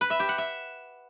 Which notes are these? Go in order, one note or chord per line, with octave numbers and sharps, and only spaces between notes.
B4
E5
G4
F#5
E5